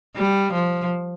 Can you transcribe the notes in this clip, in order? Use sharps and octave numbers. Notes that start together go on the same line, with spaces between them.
G3
F3